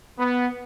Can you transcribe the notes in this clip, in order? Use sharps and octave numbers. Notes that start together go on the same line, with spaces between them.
B3